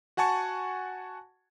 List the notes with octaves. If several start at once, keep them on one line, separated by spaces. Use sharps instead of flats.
F#4 F#5 G#5 A5 C#6